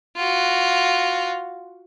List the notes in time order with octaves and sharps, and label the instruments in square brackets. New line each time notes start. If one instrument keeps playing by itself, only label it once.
[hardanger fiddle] F4 F#4